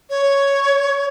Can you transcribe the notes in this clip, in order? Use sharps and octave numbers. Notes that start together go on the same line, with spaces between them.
C#5